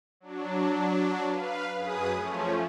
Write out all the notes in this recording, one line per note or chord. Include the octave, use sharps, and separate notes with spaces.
F#3 D4
B4 F5
F#2 G#4 B4 D#6
F3 A3 C#4